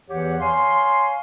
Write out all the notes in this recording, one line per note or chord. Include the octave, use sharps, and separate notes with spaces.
E2 E3 G4 C#5 F#5
C#5 F5 G#5 C6